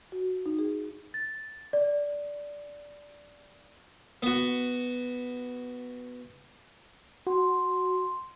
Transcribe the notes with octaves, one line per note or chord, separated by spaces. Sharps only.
F#4
D#4
G#4
A6
D5
B3 F#4
F#4 C6